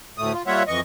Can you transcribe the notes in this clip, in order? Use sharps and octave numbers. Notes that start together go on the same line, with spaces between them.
D2 A2 A3 D#6
F4
G3 A#3 F4 C#5 E5 F#5
F2 E3 D#5 C#6